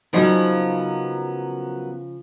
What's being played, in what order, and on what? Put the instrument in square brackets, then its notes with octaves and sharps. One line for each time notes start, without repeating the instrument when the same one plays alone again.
[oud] C#3 F3 D#4 [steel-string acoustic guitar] F#3 B3 A#4